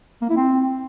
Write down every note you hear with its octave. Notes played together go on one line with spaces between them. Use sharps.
A#3
E4
C4